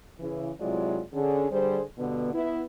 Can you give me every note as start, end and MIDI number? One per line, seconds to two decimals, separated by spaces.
0.20 0.51 49
0.20 0.51 52
0.60 1.00 48
0.60 1.00 54
0.60 1.00 56
0.60 1.00 64
0.60 1.00 65
0.60 1.00 74
1.14 1.46 50
1.14 1.46 61
1.14 1.46 68
1.51 1.81 50
1.51 1.81 55
1.51 1.81 68
1.51 1.81 72
1.98 2.31 43
1.98 2.31 47
1.98 2.31 50
1.98 2.31 59
2.33 2.63 59
2.33 2.63 64